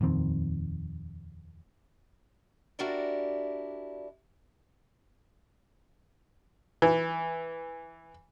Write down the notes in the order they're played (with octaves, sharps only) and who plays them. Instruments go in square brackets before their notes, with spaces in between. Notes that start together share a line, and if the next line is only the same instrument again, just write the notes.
[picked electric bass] D#1 F2 D#3 C4
[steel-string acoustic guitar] D4 E4 F#4 G4 A#4 D5
[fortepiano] E3